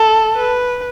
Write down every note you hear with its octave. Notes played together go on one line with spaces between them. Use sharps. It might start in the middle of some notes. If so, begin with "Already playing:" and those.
Already playing: A4
B4